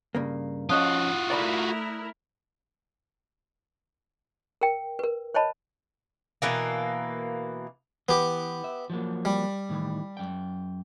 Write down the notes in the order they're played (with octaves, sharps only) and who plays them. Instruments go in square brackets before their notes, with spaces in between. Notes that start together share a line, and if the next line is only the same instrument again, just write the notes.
[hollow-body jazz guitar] G2 C#3 A#3
[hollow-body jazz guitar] F3 C#4 D#5 [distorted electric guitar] F4 F#4 [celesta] D#6 F#6
[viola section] A3 E4 A#4 [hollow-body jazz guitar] D5 A#5 B5
[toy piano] A#4 G5
A#4 B4
C5 C#5 D#5 A5 B5
[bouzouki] B2 E3 A#3
[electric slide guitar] E3 [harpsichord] B3 G4
[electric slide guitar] E5
F3 F#3 A#3
[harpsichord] G3
[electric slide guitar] A2 D#3 E3
F#2 G5